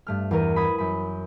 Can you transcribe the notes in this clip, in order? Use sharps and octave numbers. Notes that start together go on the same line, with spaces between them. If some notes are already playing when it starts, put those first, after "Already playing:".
G2 A3 F6
E2 A#4 D#7
B5 D#6 G#6
F#2 B5